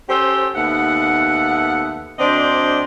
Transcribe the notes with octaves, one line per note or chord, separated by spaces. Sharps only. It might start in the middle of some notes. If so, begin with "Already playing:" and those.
C#4 G4 A4 C5
D#2 A3 B3 E5 F#5
D2 C4 D4 C5 D5 D#5